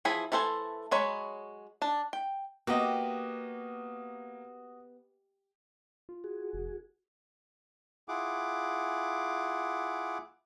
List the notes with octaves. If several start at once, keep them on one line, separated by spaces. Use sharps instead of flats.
E3 F3 E4 G#4 B5
E3 A3 A4 C5 G#5
F#3 G#3 C#5 B5
D4 A5
G5
A#3 B3 F#4 G4 D#5 A#5
F4
F#4 G#4
F1
E4 F4 G#4 F#5 D6